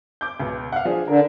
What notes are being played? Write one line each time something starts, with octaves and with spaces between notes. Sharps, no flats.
D6 G6
C#2 B2
F5 F#5
F3 D4 G#4
D3 A#4